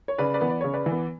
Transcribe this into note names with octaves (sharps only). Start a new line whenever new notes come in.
C#5
C#3 B4 D5
B4 D5
E3 B3
D5
C#3 C#5
B4 D5
E3
B3